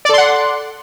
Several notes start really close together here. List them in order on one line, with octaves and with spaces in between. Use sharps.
D5 A4 C6 F#5